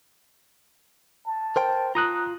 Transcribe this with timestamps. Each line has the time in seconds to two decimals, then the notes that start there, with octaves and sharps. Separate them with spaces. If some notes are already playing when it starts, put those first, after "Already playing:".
1.26 A5
1.56 A#4 C5 G5
1.95 F4 A#5 D#6 F#6